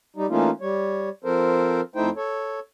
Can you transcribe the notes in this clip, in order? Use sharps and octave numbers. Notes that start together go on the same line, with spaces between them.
G3 D#4
E3 A3 A#3 C#4 D#4 F4
G3 C#5
F3 C4 A4 A#4 C5
F2 A3 D#4 E4 C5 G5
A4 C#5